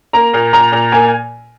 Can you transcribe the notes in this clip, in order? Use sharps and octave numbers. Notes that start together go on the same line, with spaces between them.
A#3 A#5
A#2
A#2 A#5
A#2
A#3 G#5